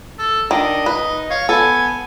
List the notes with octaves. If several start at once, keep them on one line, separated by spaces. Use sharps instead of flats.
A4
D#3 D4 D#5
D#4 B4
C#5 F5
B3 A4 G#5